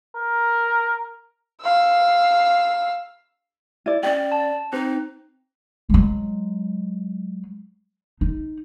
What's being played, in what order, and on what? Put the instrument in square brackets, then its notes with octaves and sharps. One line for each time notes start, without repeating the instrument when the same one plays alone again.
[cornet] A#4
[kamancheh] F5 E6
[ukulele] E4 D5
[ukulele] C#4 G5 [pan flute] D5
[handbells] A5
[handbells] C4 [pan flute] D#4 [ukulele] C5
[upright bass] F#3 G#3
D#4